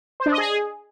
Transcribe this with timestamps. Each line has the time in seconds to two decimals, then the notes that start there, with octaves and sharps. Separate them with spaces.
0.20 C5
0.26 D4
0.32 D#5
0.38 G#4